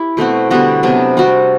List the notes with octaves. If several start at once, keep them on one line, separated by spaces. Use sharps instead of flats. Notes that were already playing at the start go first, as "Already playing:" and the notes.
Already playing: E4 G4
B2 A3 C4 F#4
D3 G3 B3 F#4
C3 F#3 B3 D4
G3 C4 F#4